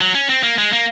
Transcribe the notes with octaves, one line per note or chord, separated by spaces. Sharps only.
F#3
C#4
C4
A#3
G#3
A#3